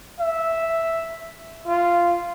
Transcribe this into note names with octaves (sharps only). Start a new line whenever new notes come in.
E5
F4